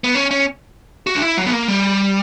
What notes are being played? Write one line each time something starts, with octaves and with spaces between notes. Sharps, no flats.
B3
C#4
C#4
F#4
D4
E4
F#3
B3
A#3
G3